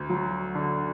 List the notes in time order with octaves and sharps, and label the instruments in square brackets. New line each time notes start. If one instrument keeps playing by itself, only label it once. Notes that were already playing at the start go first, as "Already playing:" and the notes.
Already playing: [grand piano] D2
F#3
D3